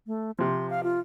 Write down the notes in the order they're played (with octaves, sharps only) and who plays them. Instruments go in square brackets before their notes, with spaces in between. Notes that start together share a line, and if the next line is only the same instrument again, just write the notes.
[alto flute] A3
[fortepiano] C3 F3 [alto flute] C6
[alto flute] F5
F4